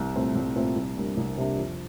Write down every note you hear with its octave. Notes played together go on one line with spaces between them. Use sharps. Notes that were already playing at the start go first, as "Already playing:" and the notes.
Already playing: C2
A#2 A3 C4
C2
A#2 A3 C4
C2
C3 G3 A#3 D4
C2
C3 G3 A#3 D4
F2